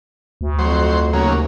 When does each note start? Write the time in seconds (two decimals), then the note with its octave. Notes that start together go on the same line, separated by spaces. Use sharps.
0.41 D2
0.59 F2 F#3 C5
1.13 D#2 C#3 F#3 A#3